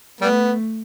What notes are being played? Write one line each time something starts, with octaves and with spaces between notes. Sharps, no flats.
G3 A3 B3